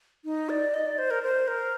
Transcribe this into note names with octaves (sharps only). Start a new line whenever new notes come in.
D#4
D5
D#5
D5
C5
A#4
C5
A#4